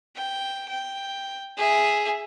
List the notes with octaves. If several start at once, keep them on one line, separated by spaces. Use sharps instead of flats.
G5
G5
G#4 E5